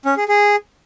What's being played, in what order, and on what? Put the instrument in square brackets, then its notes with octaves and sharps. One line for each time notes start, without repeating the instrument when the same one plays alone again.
[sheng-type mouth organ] C#4
G#4
G#4